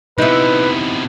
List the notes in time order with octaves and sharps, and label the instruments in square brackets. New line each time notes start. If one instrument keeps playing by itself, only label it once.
[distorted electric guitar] C3 B3 [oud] D#4 E4 [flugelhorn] B4